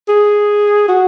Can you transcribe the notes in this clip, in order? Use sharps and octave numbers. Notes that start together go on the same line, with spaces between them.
G#4
F#4